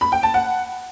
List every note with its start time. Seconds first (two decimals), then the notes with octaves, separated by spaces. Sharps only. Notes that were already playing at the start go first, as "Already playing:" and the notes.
0.01 B5
0.12 G5
0.23 A5
0.34 F#5